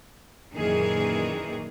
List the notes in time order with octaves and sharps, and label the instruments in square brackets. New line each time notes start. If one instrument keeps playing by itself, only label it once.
[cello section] F#2 A#2 D#3 E3 G#4